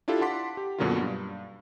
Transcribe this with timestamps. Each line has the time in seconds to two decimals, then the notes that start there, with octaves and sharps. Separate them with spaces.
0.08 D4 E4 F4 G4 A4
0.21 F#5 A5 C6 D6 B6
0.57 G4
0.78 F#2 B2 D3 F#3 A#3 F4
1.01 G2